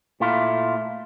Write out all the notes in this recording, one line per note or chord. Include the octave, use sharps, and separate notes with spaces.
A#2 A3 E4 F4